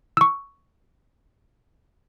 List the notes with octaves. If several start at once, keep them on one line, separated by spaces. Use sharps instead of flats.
C#6 E6